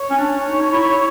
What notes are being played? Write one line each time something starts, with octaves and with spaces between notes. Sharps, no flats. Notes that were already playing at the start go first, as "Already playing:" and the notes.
Already playing: C#5
C#4
D4
D#4
E4